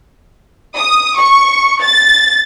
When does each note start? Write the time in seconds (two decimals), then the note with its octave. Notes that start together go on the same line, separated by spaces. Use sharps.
0.77 D#6
1.18 C#6
1.83 A6